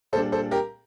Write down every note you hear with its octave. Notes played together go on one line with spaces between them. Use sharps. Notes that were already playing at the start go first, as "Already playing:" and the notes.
A#2 G3 D4 A4 C5
A4 C5
G4 A#4